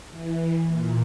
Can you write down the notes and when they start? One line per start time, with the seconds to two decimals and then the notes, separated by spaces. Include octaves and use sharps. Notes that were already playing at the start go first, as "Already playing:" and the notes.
0.11 E3
0.64 A#2